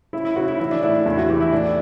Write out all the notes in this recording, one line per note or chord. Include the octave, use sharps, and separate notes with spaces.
C#3 E4
E4
C#3 F#4
E4
E3 E4
D4
A2 E4
D4
E2 E4
F#4
E3 G4
E4
A2 D4